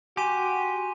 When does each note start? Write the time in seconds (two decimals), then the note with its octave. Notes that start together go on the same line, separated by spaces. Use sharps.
0.17 F#4 G4 G#5 C6 D#7